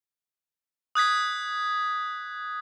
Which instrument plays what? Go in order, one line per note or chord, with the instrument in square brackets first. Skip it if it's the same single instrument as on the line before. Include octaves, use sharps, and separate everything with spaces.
[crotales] D#6 F#6 G#6 B6